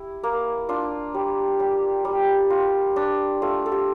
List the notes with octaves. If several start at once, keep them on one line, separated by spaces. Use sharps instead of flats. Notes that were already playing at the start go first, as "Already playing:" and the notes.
Already playing: E4 G4
A#3
D4 F4
G3
G3 G4
G3
F4
D4
A3 F4
A4
G4